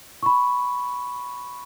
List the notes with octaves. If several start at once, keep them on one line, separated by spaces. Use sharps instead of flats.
B5 C#6